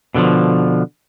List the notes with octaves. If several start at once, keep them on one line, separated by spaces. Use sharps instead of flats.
B2 D3 D#3 F3